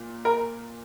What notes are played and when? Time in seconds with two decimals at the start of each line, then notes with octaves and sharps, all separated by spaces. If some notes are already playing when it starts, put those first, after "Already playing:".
Already playing: A#2
0.25 A#4